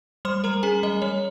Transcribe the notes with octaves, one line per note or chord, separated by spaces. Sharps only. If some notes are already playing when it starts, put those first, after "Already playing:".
G3 C5 C6
G3 A#4 A#5
C#4 G#4 G#5
G3 D#5
G3 C#5